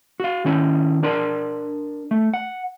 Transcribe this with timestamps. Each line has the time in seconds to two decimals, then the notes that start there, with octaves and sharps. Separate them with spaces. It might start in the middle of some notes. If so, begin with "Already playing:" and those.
0.20 F#4 F5
0.45 D#3 C#4 E4
1.03 D4 A#4 D5 C6
2.11 A3
2.34 F#5